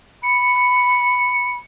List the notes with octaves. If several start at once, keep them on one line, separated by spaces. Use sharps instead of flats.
B5 C#7